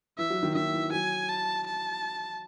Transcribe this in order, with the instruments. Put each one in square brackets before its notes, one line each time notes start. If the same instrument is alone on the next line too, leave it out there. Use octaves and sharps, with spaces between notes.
[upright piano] E3 [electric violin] E5
[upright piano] F#3
D#3
[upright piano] D#3 [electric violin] E5
[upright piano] E3
[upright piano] F#3 [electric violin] G#5
[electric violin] A5
A5